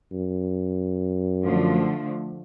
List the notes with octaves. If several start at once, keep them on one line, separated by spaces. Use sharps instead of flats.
F#2
D3 F3 A3